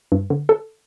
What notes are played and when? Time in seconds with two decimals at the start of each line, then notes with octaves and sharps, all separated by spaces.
0.12 G2
0.30 D3
0.49 A4